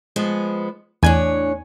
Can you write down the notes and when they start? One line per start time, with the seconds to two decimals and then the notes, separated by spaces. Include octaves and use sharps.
0.16 F3 G#3 B3
1.03 E2 A2 D4 C#5 G#5